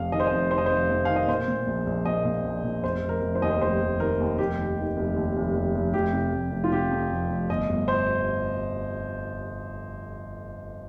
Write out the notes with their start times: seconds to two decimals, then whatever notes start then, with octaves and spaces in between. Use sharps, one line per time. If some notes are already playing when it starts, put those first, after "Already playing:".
Already playing: F1 F2 F5
0.12 D#3 D#5
0.20 C5
0.27 D#5
0.32 F1
0.51 F1 C5
0.58 D#5
0.66 F1 C5
0.90 F2
1.05 D#3 F5
1.16 D#5
1.28 A#2 C5
1.48 A#2
1.67 A#1
1.87 A#1
2.05 A#2 D#5
2.25 A#2
2.45 A#1
2.64 A#2
2.83 F1 C5
3.02 F1
3.09 A#4
3.22 F1
3.35 C5
3.42 D#2 D#5
3.51 C5
3.62 F1 C5
3.81 F1
4.00 D#3 A#4
4.20 D#2
4.38 F1 G4
4.58 D#2
4.78 D#3
4.97 F1
5.16 D#2
5.37 F1
5.55 F1
5.75 F1
5.94 F1 G4
6.13 C3
6.33 F1
6.52 F1
6.64 F4
6.71 C3 G4
6.91 F2
7.11 F1
7.30 F1
7.50 G1 D#5
7.69 G1
7.88 C5